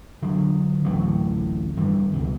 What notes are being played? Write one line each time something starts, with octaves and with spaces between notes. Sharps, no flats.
D3 F#3 G#3
D1 A1 A2 F#3
G2 D#3 E3
C#2 B2